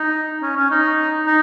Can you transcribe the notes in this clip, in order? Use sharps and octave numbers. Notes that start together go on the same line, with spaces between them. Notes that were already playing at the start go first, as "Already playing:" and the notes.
Already playing: D#4
C#4
C#4
D#4
D#4